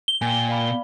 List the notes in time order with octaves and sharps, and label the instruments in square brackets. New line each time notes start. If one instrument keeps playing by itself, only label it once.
[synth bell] G7
[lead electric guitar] A#2 [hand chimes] G5 G#5
[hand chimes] D5 F5 B5